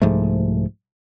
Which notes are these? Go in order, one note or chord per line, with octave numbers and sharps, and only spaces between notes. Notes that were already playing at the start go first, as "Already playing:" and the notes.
C2 G#2 F3 A3